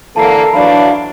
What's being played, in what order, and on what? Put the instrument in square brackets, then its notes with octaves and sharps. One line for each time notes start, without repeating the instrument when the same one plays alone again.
[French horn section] D3 E3 A#3 [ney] A4 [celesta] A5 A#5 C7
[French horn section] E3 F#3 D4 [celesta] D5 B5 [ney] F5